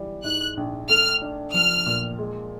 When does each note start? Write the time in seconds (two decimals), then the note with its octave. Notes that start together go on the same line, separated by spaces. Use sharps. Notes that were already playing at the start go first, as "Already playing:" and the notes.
Already playing: E3 G3
0.24 G#2 F#6
0.57 A#1
0.89 A3 F6
1.22 D4
1.54 F3 F6
1.86 A#2
2.18 G#3